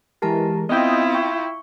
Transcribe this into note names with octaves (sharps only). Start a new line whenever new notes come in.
E3 G#3 G4 A#4 A5 A#5
B3 C4 E4 F4 D#5 G5 D#6
G5 C#6